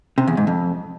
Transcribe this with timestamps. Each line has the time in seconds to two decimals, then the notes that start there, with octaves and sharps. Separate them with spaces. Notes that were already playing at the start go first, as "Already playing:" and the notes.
0.18 C3
0.27 E2
0.37 G#2
0.47 F2